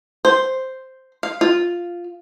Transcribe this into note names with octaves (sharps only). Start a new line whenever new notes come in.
C5
F5
F4